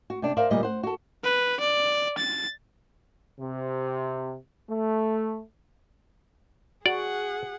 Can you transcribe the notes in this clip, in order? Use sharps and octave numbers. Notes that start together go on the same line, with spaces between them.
F#4
C3 D4
A#4 C5 D5 E5 F5
D2 A#2 G3 D#5
C5 F#5
F#4 A4
B4
D5
A6
C3
A3
F#4 G#4 D5 F#5